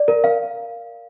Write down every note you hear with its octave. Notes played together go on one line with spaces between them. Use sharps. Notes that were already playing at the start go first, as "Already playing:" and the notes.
Already playing: D5
A#4
F5